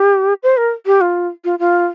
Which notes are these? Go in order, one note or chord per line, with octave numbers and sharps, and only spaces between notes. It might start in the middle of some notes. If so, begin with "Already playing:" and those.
Already playing: G4
C5
A#4
G4
F4
F4
F4